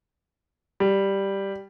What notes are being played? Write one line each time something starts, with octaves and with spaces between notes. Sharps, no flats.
G3